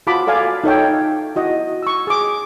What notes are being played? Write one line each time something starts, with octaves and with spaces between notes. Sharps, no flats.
F4 F#4 A5 B5 D6
A4 D5 F5 G#5
D#4 A4 C#5 G5
E4 F#4 D#5
C#6 E6
G#4 D6